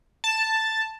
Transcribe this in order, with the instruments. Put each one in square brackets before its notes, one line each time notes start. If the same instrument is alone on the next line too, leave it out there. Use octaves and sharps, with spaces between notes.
[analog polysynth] A5